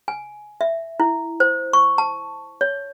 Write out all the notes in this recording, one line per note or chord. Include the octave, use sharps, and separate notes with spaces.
G#5
E5
E4
C5
C#6
A5
C#5